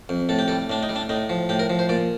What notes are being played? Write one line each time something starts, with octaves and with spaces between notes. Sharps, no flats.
F2
A2 A4
G4
G3 A4
A2 D4
D#4
G3
D4
A2 D#4
F3
A2 G4
A#4
F3
C5
A#2 D5